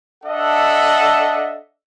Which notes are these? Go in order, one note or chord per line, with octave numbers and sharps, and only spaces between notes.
D4 A4 D#5 E5 F#5